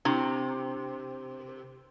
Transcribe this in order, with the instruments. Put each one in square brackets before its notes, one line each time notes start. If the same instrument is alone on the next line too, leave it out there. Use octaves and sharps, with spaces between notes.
[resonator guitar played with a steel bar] C3 [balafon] D4 E4 A#5